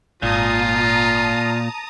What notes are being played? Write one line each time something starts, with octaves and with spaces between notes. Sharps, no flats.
G#1 A#2 F4 A5 A#5 D#6